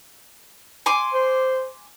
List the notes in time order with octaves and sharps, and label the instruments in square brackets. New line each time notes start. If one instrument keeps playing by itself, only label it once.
[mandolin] G#5 C6 D6
[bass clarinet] C5